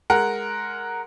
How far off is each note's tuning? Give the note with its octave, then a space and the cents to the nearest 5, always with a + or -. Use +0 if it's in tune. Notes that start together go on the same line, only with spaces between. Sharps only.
G#3 +0 A#4 +0 F#5 +0